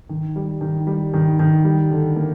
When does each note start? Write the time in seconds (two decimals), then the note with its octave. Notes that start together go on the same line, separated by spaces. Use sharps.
0.09 D#3
0.36 G3
0.61 D#3
0.87 G3
1.14 D#3
1.39 D#3
1.64 G3
1.91 D3
2.16 A#3